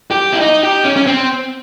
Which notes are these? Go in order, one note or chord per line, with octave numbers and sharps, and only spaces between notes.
G4
E4
D#4
G4
C#4
C#4
C4